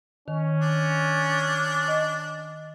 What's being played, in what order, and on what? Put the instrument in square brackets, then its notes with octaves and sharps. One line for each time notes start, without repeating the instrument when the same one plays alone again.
[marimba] D#3 [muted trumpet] C#4
[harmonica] D4
[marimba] D#5